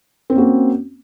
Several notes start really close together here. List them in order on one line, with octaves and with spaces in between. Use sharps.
C4 C#4 A#3 F#4